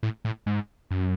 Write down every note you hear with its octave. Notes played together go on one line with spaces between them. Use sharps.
A2
A2
G#2
F#2